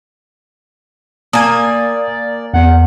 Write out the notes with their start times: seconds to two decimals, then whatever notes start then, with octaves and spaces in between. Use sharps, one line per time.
1.33 A#3 D5 G#5 D#6
2.54 E2 B3 F#5